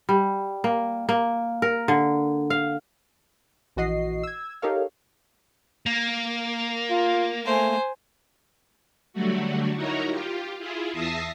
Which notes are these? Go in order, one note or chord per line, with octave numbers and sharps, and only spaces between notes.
G3
A#3
A#3
A#4
D3
F5
A#1 E3 F#4 D#5 C7
E6 G#6
D#4 G4 A4 A#4 C#5 F5
A#3
F4
A3 C5 G#5
D3 F#3 G3 A3 F#4
D#4 E4 F#4 A#4 C#5 A#5
F4 G4
E4 F4 G#4
E2 E5 A5 D#6 A#6 C7